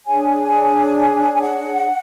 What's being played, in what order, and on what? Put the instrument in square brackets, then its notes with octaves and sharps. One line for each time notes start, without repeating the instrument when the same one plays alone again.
[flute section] D4 G#4 C#5 G#5
G#5
F#5